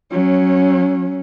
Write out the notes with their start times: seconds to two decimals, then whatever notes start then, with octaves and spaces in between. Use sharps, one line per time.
0.12 F#3 C#4